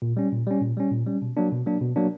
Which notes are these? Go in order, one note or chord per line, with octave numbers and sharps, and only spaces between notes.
A#2
G3 C#4
A#2
G3 C#4
A#2
G3 C#4
A#2
G3 C#4
B2
F#3 A#3 D4
B2
F#3 A#3 D4
B2
F#3 A#3 D4